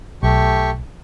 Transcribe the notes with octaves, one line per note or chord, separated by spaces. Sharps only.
B1 A3 G4 C#6